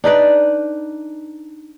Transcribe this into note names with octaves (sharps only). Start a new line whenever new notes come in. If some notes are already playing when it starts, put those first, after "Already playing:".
D4 D#4 B4 D5